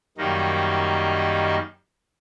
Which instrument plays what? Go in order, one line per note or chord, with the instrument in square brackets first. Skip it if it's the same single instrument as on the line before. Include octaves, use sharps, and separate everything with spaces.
[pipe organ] F#2 D#3 G3 A#3 D#4